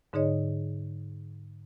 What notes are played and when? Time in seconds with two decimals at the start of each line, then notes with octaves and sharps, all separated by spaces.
0.13 G#2 D3 D#4 G#4 C#5 D#5